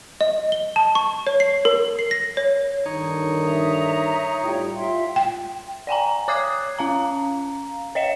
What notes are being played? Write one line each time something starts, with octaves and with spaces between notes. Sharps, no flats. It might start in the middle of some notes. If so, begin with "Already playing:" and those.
D#5
G7
A5
C#6
C#5
C7
A#4
C7
A#6
C#5
G2 D3 D#3 D#4 C#5
E5 A#5 D#6
A2 G3 F4 G5
F4 E5 G5 C6
G5
D5 G5 G#5 A#5
C#5 D6 D#6 F#6 G#6 C7
C#4 F5 A#5
C#5 D#5 C#7 E7